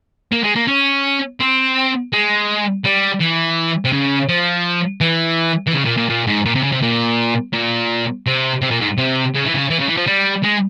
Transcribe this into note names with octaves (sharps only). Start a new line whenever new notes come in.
A#3
G#3
A#3
C#4
C4
G#3
G3
E3
C3
C#3
F3
E3
E3
C#3
A#2
A#2
A#2
G#2
A#2
C3
C#3
C3
A#2
A#2
C3
C3
A#2
G#2
C3
C#3
E3
C#3
E3
C#3
E3
F3
G3
G#3